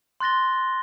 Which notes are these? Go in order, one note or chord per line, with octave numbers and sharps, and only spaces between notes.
C6 F#6 A6 A#6 G7